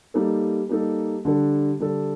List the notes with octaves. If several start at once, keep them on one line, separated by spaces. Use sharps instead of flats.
G3 A#3 D#4 A4
G3 A#3 D#4 A4
D3 G3 D4 A4
D3 G3 D4 A4